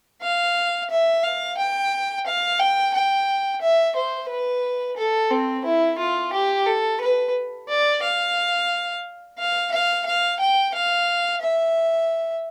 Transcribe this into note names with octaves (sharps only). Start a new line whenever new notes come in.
F5
E5
F5
G5
F5
G5
G5
E5
C5
B4
A4
C4
E4
F4
G4
A4
B4
D5
F5
F5
F5
F5
G5
F5
E5